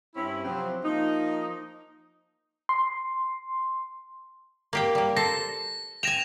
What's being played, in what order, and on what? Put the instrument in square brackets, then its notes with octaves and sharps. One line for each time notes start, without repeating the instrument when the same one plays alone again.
[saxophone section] G2 C4 C#4 E4
C3 F3 F#3 C4
F3 A#3 D#4
[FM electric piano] C6
[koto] A#3 G4 G5
G3 A#3
[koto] A4 C5 [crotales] A#6
[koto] G5 G#5 [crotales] A#6 E7 F7